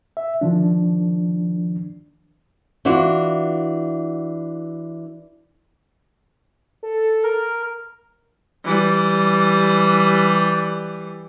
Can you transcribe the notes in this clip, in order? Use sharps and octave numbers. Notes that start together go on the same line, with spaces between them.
E5
D#3 F3 D4
E3 D4 F4 F#4
A4
A#4
E3 G3